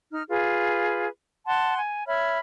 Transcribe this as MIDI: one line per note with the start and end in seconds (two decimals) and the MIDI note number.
0.12 0.23 63
0.12 0.23 89
0.29 1.08 65
0.29 1.08 68
0.29 1.08 71
1.46 1.78 78
1.46 1.78 81
1.46 1.78 84
1.78 2.06 80
2.06 2.38 73
2.06 2.38 76
2.06 2.38 83
2.06 2.38 89